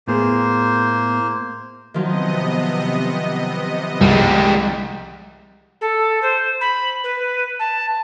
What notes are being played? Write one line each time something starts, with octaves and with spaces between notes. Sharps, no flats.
A2 A#3 B3 G#4 C5
C3 D#3 F3 F#3 B3 D#5
C2 G3 G#3
A4
C5
B5
B4
A5